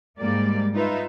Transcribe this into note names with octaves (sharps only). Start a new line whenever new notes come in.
G#2 G3 G#3 A#3 D5
D#4 F4 B4 E5